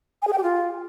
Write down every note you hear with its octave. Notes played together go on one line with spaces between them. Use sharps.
G#5
G#4
G5
G4
F4